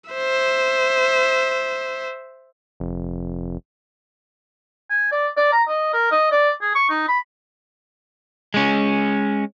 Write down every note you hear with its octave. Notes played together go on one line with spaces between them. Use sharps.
C5 E5
F1
G#5
D5
D5
A#5
D#5
A#4
D#5
D5
G#4
C#6
D#4
B5
G#3 C#4